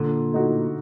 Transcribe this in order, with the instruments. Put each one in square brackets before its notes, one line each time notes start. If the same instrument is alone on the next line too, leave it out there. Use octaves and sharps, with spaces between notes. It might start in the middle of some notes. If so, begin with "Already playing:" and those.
Already playing: [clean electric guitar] A#2 [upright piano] D3
[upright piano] A3 D#4 F#4